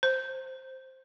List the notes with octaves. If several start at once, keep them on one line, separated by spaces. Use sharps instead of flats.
C5